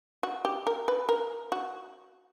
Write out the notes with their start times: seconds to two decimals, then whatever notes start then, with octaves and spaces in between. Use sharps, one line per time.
0.23 F#4
0.45 G4
0.67 A#4
0.88 B4
1.09 A#4
1.52 F#4